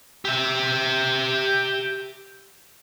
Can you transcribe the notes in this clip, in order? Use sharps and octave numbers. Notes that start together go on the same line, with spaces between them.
G4 E5